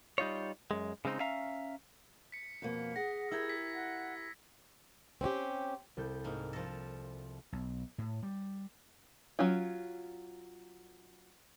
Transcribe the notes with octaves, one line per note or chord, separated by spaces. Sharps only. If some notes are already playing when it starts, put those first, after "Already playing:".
G3 D#4 F4 C#5
F#2 G#3
C#3 G#3 C4 D#4
C#4 E5 F5 A#5
B6 C#7
F2 B2 A#3
G#4 F#5 A#6
E4 G4 A#4 E6 G#6
B6
F#5
C4 C#4 F#4 G4
C2 A4 G6
G#2 A#3
F3 A4 G6 A#6
B1
A2
G3
F#3 C#4 F4